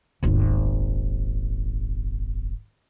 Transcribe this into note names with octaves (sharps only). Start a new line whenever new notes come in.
D#1 G#1